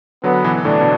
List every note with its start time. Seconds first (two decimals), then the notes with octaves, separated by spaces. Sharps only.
0.23 D3 F#3 B3
0.44 B2 E3
0.65 A2 D3 D4
0.81 B2